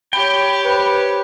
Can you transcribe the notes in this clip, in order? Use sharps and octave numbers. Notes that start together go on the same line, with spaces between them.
G4 C#5 G5 B5
B4 C5